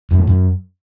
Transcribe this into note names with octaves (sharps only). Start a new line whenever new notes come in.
F#2
A2
F#2